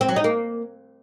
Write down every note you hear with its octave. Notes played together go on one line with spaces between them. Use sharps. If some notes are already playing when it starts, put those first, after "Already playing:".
C4
F#3
D#4
A#3